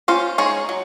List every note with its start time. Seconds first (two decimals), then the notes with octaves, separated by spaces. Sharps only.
0.08 C#4 F4 C5
0.38 G#3 D#4 G#4 C#5
0.69 F#3